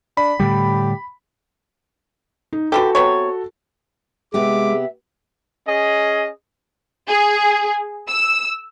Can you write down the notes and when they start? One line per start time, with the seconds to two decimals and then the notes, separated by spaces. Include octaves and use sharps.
0.17 D4 B5
0.40 A2 D3 G3 G4
2.53 D#4
2.72 D3 E3 F#4 G4 A4
2.95 C3 B3 C#5
4.34 C3 G#3 B3 G4 E5 D6
5.67 C#4 G#4 D#5
7.08 G#4
8.08 E6